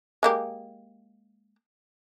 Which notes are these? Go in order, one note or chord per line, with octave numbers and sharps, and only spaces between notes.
G#3 A#3 G4